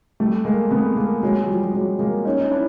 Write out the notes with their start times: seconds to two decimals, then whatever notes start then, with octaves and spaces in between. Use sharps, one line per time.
0.20 G3 A3
0.45 G#3 A#3
0.71 A3 B3
0.96 G#3 A#3
1.23 F#3 G#3
1.44 F#3
1.48 F3 G3
1.63 G3
1.74 F#3 G#3
1.99 G#3 A#3
2.25 C#4 D#4
2.39 D#4
2.51 D4 E4